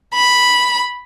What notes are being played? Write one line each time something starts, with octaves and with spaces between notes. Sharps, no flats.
B5